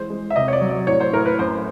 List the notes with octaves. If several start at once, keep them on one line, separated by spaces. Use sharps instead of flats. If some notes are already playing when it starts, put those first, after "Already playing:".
Already playing: E3 G#3 C5
G#3
E5
C3 D#5
C#5
D5
F#3
D5
A2 C#5
C5
A2 A#4
B4
F#2 C5